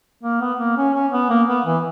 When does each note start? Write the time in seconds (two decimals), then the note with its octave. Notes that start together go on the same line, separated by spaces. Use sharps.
0.23 A#3
0.41 B3
0.60 A#3
0.77 C#4
0.94 C#4
1.12 B3
1.30 A#3
1.48 B3
1.66 E3